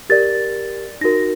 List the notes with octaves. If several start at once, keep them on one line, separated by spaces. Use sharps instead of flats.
G4 A#4 D5 A6
D#4 F#4 A#4 A#6